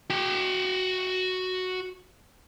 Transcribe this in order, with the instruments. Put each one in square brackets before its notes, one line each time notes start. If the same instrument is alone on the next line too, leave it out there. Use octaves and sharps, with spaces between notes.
[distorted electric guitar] F#4 G5